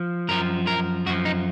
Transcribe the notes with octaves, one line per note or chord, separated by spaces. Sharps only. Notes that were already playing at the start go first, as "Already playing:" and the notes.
Already playing: F3
F#2 F3 A#4
A#4
F#2 F3 F#4
D#4